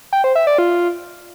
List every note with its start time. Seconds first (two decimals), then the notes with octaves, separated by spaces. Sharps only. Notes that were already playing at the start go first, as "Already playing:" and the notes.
0.13 G5
0.24 C5
0.36 E5
0.47 D5
0.58 F4